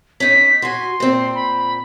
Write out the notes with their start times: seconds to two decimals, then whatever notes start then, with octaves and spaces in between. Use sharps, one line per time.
0.20 C#4 D#4 B6
0.62 F#4 G#5 C6
1.00 A#2 C4
1.34 B5